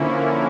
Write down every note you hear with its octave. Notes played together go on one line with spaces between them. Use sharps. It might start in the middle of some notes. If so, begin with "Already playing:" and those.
Already playing: D3 F3 A#3 C#4 E4